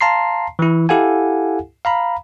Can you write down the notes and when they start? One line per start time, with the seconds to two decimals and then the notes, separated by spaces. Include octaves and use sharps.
0.01 F5 A5 A#5 C6 C7
0.59 E3 E4
0.89 E4 G4 A4 F5 F#5 G#5
1.85 F5 A#5 B5